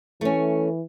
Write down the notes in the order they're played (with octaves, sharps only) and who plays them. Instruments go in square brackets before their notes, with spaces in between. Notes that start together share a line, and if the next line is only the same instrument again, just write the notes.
[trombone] E3 [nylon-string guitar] A3 C#4